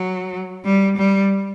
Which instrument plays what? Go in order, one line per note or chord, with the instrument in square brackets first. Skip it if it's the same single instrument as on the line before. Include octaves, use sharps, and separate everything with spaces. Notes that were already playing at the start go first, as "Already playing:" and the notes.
Already playing: [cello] F#3
G3
G3